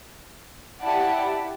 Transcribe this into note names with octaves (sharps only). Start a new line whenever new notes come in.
E4 G4 D5 F#5 A5